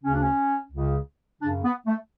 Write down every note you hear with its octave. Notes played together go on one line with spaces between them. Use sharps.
C#3 C#4
D2 D4
C#4
C#2 C#3
F#2 C#3 D4
B3
A3